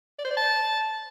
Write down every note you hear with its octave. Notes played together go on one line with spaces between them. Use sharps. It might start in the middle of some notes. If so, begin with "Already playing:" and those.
D5
C5
D5
A5